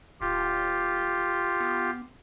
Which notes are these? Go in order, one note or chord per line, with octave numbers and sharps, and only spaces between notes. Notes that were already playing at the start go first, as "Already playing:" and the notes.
D1 F4 G4
B3